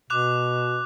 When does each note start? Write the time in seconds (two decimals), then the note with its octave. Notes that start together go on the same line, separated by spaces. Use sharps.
0.10 B2 D6 F#6 F7